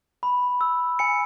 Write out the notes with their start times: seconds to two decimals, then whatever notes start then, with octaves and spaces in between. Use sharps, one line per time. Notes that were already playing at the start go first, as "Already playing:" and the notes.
0.23 B5
0.61 E6
0.99 G#5 C#7